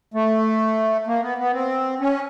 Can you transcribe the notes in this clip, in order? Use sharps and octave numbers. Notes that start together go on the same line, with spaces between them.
A3
A#3
B3
B3
C4
C#4